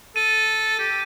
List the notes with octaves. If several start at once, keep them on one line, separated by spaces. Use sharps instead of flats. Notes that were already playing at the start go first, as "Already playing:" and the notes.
A4 D#7
G4